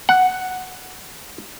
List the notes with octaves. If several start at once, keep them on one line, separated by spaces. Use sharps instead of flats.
F#5